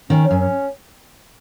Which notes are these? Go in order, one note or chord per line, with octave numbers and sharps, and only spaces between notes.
D#3 C#4
C#4
F#2
C#4